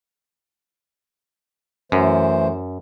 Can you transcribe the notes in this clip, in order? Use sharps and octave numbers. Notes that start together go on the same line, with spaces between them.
F#2 E3 A3 C5